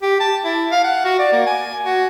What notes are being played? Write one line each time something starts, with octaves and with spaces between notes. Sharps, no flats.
G4
A5
E4
F5
F#5
F#4
D5
A#3
G#5
F#4